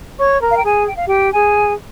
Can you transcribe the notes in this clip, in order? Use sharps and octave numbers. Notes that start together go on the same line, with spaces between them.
C#5 C#6
A#4 A#5
F5
G5
G#4 G#5
G5
F5
G4 G5
G#4 G#5